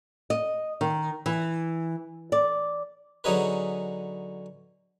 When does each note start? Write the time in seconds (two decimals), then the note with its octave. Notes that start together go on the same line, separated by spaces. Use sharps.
0.30 D#5
0.81 D#3
1.26 E3
2.32 D5
3.24 D3 F#3 C#4 D#4 G#4 B4